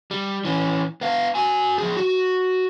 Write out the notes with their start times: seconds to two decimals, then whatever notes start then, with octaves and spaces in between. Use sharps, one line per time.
0.11 G3
0.45 E3 C#4
1.01 B3 F5
1.35 F#4 G#5
1.78 F3 G#4
1.97 F#4